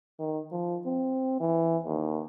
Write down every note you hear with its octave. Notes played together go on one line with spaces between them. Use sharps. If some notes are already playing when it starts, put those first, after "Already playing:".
D#3
F3
C4
E3
D#2